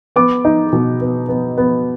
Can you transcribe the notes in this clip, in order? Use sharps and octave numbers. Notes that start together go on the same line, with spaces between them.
B3 D6
D#4
B2
B3
B3
B3